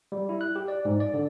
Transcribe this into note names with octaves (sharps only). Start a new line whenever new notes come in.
G3
E4
F#6
G4
D5
G#2
D5
D3